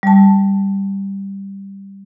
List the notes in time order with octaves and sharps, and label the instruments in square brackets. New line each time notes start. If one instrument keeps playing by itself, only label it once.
[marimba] G3 A5